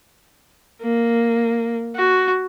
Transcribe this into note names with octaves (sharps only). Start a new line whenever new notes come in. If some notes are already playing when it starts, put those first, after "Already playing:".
A#3
F#4